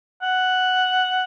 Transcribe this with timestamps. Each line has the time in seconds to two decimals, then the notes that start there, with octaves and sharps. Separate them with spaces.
0.22 F#5